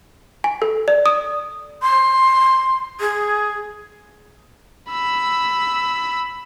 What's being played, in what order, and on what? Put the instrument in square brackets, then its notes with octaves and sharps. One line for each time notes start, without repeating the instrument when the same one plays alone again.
[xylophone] G#5
A4
D5
D#6
[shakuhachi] C6
G#4
[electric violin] B5 E6